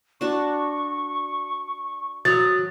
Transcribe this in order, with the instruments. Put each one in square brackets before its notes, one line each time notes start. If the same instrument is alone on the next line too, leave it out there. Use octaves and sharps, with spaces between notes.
[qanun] D4 F#4 [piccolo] C#6
[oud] F#3 [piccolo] D#6 [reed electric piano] A6